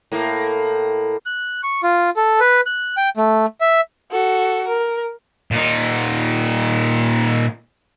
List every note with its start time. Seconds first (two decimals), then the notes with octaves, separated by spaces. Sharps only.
0.12 A2 A#3
1.26 F#6
1.63 C#6
1.83 F4
2.16 A4
2.40 B4
2.66 F#6
2.97 G5
3.17 A3
3.61 E5
4.11 F#4 A4
4.68 A#4
5.51 A#2 D#4